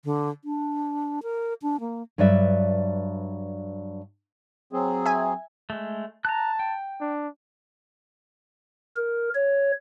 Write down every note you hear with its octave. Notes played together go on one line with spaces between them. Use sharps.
D3
D4
A#4
D4
A#3
G2 F#3 B4 D5 E5
F#3 C4 G#4
E5 G#5
G#3 A3
A5 A#5 F#6
G5
D4
A#4
C#5